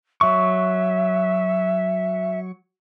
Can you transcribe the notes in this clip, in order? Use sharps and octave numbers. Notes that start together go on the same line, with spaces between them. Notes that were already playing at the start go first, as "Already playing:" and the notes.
F#3 E5 C#6